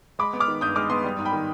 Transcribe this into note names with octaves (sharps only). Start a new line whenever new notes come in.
G#3 B5 D6
B3
D6 F6
D#3
G2 D#6 G6
G#3 D6 F6
B3 C6 D#6
G3
G#2
G5 B5
D#3